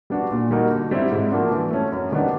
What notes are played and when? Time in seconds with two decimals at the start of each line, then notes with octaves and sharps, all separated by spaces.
0.10 G3 B3 D4 F#4
0.31 A#2
0.51 G3 A#3 D#4 F#4
0.71 D3
0.91 G3 C4 E4
1.11 G#2
1.31 F3 A#3 D4 F#4
1.51 E3
1.71 A3 C#4
1.92 F#2
2.12 D#3 G3 B3 D4